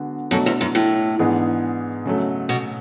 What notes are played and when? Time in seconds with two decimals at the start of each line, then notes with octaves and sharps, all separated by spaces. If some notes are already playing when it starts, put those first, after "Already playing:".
Already playing: D3 G#3 B3 F#4
0.31 F#2 B2 F#3 A3 D4 A4
0.46 E2
0.61 F#2
0.75 A2
1.19 G#2 E3 B3 D4 G#4
2.06 C#3 F#3 A3
2.49 B2